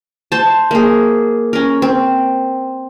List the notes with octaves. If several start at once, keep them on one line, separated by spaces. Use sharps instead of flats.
C5 A5
A#3 G#4
C#4 A#4
C4